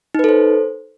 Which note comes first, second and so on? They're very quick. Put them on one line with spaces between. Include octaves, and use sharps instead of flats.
D#4 B4 A4 C5